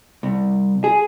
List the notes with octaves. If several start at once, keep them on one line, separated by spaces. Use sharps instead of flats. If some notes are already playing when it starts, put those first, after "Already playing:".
C2
G#4